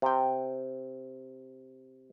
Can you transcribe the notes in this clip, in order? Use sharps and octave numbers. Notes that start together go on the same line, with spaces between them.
C3 G5